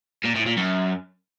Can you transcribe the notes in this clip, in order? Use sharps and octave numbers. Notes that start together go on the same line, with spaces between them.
A#2
A2
A#2
F#2